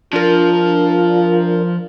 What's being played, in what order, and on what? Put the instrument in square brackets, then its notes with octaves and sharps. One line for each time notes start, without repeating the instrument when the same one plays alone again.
[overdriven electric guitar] F3 [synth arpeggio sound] D4 A#4 [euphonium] F4